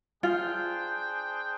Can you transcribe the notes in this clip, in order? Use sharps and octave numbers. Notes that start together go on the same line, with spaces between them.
D4 F4 G#4 C5 G5